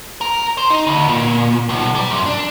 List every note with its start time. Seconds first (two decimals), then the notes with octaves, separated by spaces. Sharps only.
0.21 A#4
0.58 C5
0.70 D#4
0.87 D2
1.08 A#2
1.69 B1
1.95 G3
2.11 F#2
2.26 D4